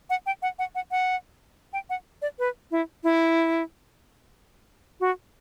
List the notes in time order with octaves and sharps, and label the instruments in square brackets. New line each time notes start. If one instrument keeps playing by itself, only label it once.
[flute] F#5
G5
F#5
F#5
F#5
F#5
G5
F#5
D5
B4
E4
E4
F#4